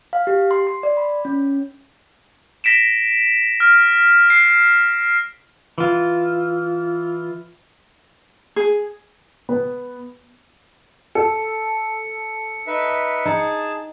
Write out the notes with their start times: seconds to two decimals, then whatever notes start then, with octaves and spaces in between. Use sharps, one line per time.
0.13 F5
0.27 G4
0.51 C6
0.67 C6
0.83 D5
0.97 B5
1.25 C#4
2.64 A#6 B6 D7 E7
3.60 F6
4.30 C7
5.78 E3 F4
8.56 G#4
9.49 B3
11.15 A4 C#7
12.67 D#4 B4 E5
13.25 D#4 G#4 A5